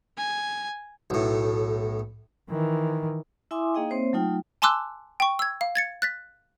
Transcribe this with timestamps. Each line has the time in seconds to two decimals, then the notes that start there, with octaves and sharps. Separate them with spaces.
0.18 G#5
1.10 B1 A2
2.50 D#3 E3
3.51 E4 E5 G#5 C6 D6 D#6
3.75 A#3 D#4 G#4 D#5 F5 G5
3.89 A#3 C4 C5 C#5 E5
4.13 F#3 A3 D#4 F4 G5
4.62 G#5 A5 C6 D6 E6 F#6
5.20 G5 C#6
5.39 E6 G#6
5.61 F5
5.75 G#6 A6 C#7
6.02 F#6 A6 B6